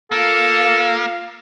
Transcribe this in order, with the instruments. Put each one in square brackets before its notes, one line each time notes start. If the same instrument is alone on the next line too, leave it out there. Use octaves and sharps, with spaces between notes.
[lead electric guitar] A#3 [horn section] F4 F5 [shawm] A4